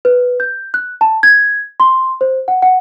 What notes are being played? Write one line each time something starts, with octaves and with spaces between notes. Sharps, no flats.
B4
G6
F#6
A5
G#6
C6
C5
F#5
F#5